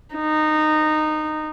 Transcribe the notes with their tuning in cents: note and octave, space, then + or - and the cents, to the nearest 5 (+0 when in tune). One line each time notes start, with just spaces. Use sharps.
D#4 -15